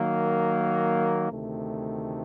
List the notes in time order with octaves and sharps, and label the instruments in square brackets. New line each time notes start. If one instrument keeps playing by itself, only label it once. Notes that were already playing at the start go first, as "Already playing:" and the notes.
Already playing: [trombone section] D#3 F#3 A#3
D2 C3 D#3 A3